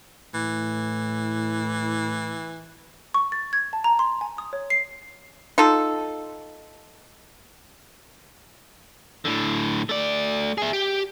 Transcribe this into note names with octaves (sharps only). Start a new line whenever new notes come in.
A2 E3
C#6
A6
G#6
A5
A#5
C6
G#5
D#6
C#5
C7
D#4 F4 A4
A2 D3
A3 D5
G#4 E5
G4